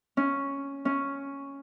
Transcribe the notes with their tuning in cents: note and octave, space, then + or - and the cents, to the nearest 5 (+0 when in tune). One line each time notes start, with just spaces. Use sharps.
C#4 +0
C#4 +0